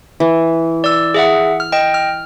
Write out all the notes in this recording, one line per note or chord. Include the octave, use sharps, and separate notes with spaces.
E3
D5 E6
G#4 E5 F#5
F6
D#5 G5
F6